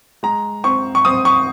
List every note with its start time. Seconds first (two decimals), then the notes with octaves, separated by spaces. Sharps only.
0.23 G#3 A#5
0.64 C4 C#6
0.95 C#6
1.05 C4 D#6
1.25 C#6